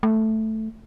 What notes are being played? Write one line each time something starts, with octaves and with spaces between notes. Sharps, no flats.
A3